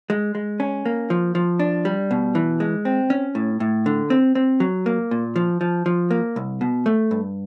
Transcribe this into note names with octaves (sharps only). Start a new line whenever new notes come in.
G#3
G#3
C#4
A#3
F3
F3
D4
G3
B2
E3
G#3
C4
C#4
A2
A2
D3
C4
C4
F#3
A#3
A#2
F3
F3
F3
A#3
C2
B2
A3
G2